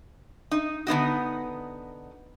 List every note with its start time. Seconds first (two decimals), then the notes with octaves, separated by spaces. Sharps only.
0.51 D#4
0.87 D3 B3 D#4 F#4